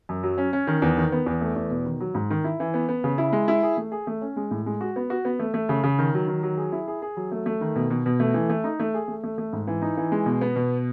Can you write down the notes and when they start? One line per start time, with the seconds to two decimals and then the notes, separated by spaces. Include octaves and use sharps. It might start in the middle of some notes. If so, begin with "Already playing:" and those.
0.09 F#2
0.23 F#3
0.38 C#4
0.53 C#4
0.67 D#3
0.82 E2
0.97 D#3
1.12 B3
1.26 E2
1.41 A3
1.56 E2
1.70 B2
1.85 D#3
2.00 F#3
2.15 G#2
2.30 D#3
2.44 E4
2.60 E3
2.74 B3
2.89 B3
3.04 C#3
3.18 E4
3.33 G#3
3.48 E4
3.63 G#4
3.77 A3
3.92 G#4
4.07 A3
4.22 C#4
4.36 G#3
4.51 A2
4.66 G#3
4.81 F#4
4.96 B3
5.10 F#4
5.25 B3
5.39 A3
5.54 A3
5.69 C#3
5.84 C#3
5.99 D#3
6.14 F#3
6.28 D#3
6.43 F#3
6.58 G#4
6.72 E4
6.88 G#4
7.02 G#4
7.17 F#3
7.32 A3
7.46 A3
7.61 D#3
7.76 B2
7.90 B2
8.06 B2
8.20 A3
8.34 E3
8.50 A3
8.64 D#4
8.80 A3
8.94 G#4
9.08 A3
9.24 A3
9.38 A3
9.53 G#2
9.67 E3
9.82 D#4
9.97 E3
10.12 G#3
10.26 B2
10.41 B3
10.56 B2